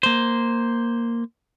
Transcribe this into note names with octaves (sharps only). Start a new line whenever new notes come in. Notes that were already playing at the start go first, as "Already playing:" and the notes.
A#3 C5